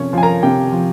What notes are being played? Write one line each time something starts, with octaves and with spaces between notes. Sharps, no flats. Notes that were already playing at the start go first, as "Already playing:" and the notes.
Already playing: C3 F3 C#4 C#5
F3 G#5
A#4 A#5
C3 G4 G5
F3